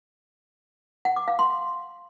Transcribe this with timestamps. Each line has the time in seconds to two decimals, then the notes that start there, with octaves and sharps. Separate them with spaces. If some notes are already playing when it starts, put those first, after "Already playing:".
1.05 F#5
1.16 D6
1.28 F5
1.39 C6